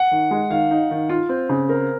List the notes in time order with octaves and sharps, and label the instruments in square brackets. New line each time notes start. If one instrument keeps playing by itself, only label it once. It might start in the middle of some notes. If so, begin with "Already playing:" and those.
Already playing: [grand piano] F#5
[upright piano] D#3
G#3
[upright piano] D#3 [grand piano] F5
[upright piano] D#4
D#3
F4
C4
C#3
[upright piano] C4 [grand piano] A#4